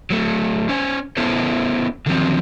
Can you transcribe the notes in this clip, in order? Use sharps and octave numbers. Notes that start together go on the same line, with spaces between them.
F#3 A3
C#4 C5 G#5
B3 C#4 E4 A4 C5
D3 D#3 F3 F#3 C4